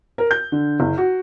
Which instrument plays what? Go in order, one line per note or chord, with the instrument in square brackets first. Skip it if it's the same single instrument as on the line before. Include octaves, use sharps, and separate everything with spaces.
[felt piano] A#4
G6
D3
F#1
F#4